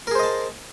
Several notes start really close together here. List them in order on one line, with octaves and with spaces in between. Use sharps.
A#4 G#4 C5 D#5 A5